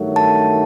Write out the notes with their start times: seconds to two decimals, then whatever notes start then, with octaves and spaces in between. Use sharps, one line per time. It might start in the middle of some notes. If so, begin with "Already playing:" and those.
Already playing: G2 D#3 F#3 A3
0.16 A5